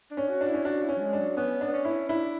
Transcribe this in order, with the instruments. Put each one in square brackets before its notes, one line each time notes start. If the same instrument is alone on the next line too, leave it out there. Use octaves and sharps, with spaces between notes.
[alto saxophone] D4
[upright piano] C#4
[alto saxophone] F#4
[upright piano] D4
[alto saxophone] E4
[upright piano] C#4
[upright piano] D4 [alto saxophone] F#4
[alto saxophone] E4
[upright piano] C#4
[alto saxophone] F#3
G#3
[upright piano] D4
[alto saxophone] F#3
[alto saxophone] B3 [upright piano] C#4
[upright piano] D4
[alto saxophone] B3
C#4
[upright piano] E4
[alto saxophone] D4 [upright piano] E4